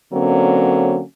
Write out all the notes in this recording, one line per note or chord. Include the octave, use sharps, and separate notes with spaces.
D3 F#3 A#3 C4 C#4